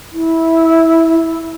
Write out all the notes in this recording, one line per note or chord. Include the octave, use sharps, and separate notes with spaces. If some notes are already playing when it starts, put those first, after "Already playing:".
E4